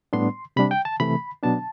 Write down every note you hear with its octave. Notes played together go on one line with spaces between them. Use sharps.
A2 G3 B3 D4 C6
C3 G3 D4 B5
G5
A5
C3 E3 A3 B5
B2 F#3 B3 D4 A5